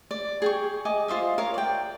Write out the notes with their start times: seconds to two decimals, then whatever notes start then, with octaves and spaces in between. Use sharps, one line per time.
0.11 D5
0.42 G#4 G5 C#6
0.85 D#5 G#5 D6
1.08 F4 C5 D#5 E5
1.38 A#4 C#5 F5
1.54 D5 G5